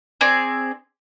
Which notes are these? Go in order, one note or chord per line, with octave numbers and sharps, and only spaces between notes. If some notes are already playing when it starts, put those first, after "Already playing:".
C4 G#4 D5